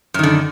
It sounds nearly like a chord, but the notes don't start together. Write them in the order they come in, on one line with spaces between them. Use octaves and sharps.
F#2 D#3 D3